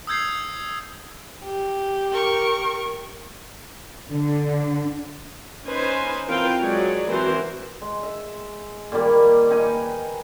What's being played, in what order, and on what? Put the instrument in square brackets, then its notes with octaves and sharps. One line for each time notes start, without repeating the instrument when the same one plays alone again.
[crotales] D#6 E6 G6 G#6 C7
[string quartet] G4
[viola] A#4 C#6
[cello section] D3
[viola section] C#4 D#4 B4 C5 G#5
E3 C4 F4 A#4 F5 G5
F#3 G#3 C#5 D5
E3 C4 F#4 A#4 C5
[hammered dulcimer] G#3
E5
A#2 D#3 G3 A#3
D#4 B4 G#5